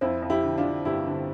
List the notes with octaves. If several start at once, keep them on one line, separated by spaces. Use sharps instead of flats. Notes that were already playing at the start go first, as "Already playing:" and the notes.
F2 C4 E4
F2
E4 G4
D3
D4 F4
D3
G1 E4 G4
D3